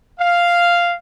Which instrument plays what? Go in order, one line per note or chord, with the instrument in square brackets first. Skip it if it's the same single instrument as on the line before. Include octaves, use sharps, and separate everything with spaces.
[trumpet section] F5